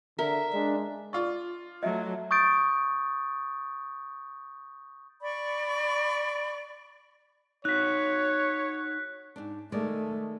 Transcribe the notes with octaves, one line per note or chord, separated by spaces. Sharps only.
D3 A#4 E5
G#3 D4
F4 D5 C#6
F#3 A3 D#5 E5
C#6 D#6 G6 A6 D7
D5 B5 C#6
D#4 F#4 C#5 F#6 B6
G#2 D4
D#3 G#3 A3 D5